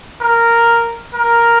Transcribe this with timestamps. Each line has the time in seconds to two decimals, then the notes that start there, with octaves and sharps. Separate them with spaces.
0.21 A#4
1.14 A#4